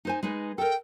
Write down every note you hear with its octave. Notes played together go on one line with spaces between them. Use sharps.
D#4 C5 G#5
G#3 D#4 B4
A4 A#4 G5